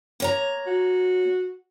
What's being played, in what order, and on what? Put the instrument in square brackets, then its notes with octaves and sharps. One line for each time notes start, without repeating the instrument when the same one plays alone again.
[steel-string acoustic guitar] A#3 C#5 A#5
[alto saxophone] F#4